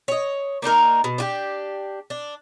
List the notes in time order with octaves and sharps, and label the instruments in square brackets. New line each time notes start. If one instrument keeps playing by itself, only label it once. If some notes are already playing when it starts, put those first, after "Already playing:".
[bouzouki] C#5 D#5
A#3 D4 D#4 A#4
B2
D4 F#4 G4
D4